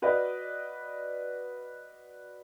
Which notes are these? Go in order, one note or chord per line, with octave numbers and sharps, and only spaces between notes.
F#4 B4 D5 D#5 F5